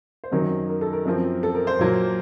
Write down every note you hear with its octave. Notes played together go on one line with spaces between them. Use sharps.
C5
F#2 D#3 F#3 A#4
A#4
A4
A#4
F#2 F3 C4
A4
A#4
C5
A#2 F#3 A#3